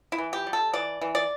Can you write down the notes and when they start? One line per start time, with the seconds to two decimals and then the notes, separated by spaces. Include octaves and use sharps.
0.12 E4
0.18 E3
0.33 G4
0.47 G3
0.53 A4
0.73 E3 D5
1.01 E3
1.15 D5